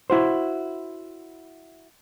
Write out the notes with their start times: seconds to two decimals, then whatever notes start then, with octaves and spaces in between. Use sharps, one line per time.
0.10 E4 F#4 C5